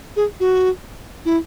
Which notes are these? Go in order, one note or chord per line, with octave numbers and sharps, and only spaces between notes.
G#4
F#4
E4